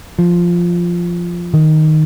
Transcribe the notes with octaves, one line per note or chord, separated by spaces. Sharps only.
F3
D#3